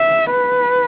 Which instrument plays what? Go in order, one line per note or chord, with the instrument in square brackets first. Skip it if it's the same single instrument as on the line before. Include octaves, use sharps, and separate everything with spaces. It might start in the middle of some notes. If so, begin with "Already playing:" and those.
Already playing: [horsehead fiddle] E5
B4